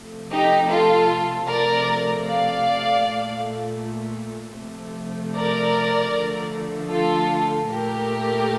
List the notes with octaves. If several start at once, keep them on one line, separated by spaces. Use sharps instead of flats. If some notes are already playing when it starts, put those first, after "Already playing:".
Already playing: C3 F3 A3
D#4 G4
F4 A4
C3 F3 A3 A#4 D5
D5 F5
A#2 A3
C3 F3 A3
A#4 D5
D3 F3 A3
F4 A4
A#2 A3 G4 A#4